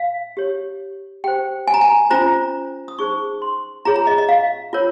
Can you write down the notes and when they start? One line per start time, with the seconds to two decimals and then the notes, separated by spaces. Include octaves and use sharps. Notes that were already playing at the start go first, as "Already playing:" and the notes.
Already playing: F5
0.37 G4 C#5
1.24 G4 C5 G5
1.68 G#5
1.74 A#5
1.81 G#5
2.10 C#4 F4 C5 A#5
2.88 D#6
2.99 D#4 G#4 C5 C#6
3.42 C6
3.85 F4 G#4 C#5 A#5
3.96 A#5
4.07 D#5
4.18 D#5
4.29 F5
4.73 F4 A#4 C#5